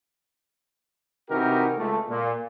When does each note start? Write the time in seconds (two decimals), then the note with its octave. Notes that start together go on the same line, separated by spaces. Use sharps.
1.30 C3 E3 D#4 F#4 G4 A#4
1.77 C#2 A3
2.09 A#2